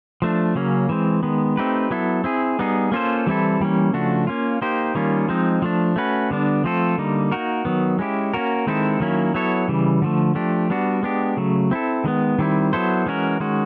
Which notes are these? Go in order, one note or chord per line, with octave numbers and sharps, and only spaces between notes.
F3 A3 D4
C#3 F#3 A#3 C#4
E3 G#3 C4
D#3 G#3 B3
A3 C4 D#4 G4 B4
F#3 B3 E4 A4
C4 E4 G#4
G3 B3 D#4 G#4
A#3 C#4 F4 A4 C5
E3 G3 C4 E4 A4
E3 G3 A#3 C#4
C#3 F3 A3 D4 F#4
A#3 C#4 F4
A#3 D#4 G4 C5
D#3 G3 A#3 C#4 F4
F3 G#3 C4 D#4
F3 A3 D4
A3 C#4 F#4 B4
D3 G3 B3 D4
F3 A3 C4 F4 A4
D3 G3 A#3 D#4
A#3 D#4 F#4 A#4
D#3 F#3 B3
G#3 C#4 E4 G4
A#3 C#4 F#4 A#4
D#3 G#3 C4 E4 A4
D#3 F#3 A#3 C#4 E4
F#3 B3 E4 A4 C#5
C#3 E3 G3
D3 F3 A3
F3 A3 D4 G4
G3 B3 D4 F#4
G#3 B3 D4 G4
C#3 F#3 A3
C4 E4 A4
D#3 G#3 B3
D#3 G3 C4 E4
F#3 B3 E4 A4 C5
E3 G#3 C#4 F#4 A#4
D#3 G#3 C#4 F#4